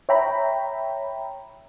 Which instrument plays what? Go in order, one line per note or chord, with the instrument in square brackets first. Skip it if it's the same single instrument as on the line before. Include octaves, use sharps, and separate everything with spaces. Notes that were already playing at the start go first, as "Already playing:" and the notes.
[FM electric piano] C#5 E5 G5 A#5 B5